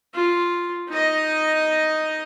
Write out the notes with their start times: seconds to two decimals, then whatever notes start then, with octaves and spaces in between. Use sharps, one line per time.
0.14 F4
0.89 D#4 D#5